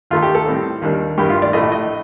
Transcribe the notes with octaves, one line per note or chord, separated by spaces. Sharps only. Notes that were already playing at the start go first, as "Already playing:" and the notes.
D#2 D#3 A3 D#4 F4
G4
A4
A2 G3 C4
D#2 D#3 G3 A#3 D4
A1 G2 D#3 G4
F4
D5
A#1 A2 A3 D#5
D#5